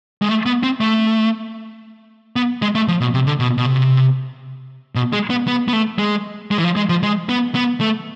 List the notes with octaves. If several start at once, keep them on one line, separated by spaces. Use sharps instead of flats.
G#3
A3
B3
C4
A3
B3
G#3
A3
F3
B2
C3
D3
B2
B2
C3
B2
G#3
B3
B3
B3
A3
G#3
G#3
E3
F3
G#3
F3
G#3
B3
B3
A3